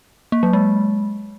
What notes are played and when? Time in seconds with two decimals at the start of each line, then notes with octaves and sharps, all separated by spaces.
0.32 A#3
0.43 F#3
0.53 G#3